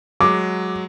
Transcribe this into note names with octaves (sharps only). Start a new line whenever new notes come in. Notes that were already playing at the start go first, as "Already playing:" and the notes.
F#3 G#3 D6